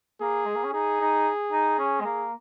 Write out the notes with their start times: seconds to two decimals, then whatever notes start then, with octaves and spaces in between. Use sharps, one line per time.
0.21 A#3 G#4
0.45 G#3
0.55 A#3
0.64 C#4
0.73 D#4 G#4
1.00 D#4
1.52 D#4
1.79 C#4
2.01 G#3
2.05 A#3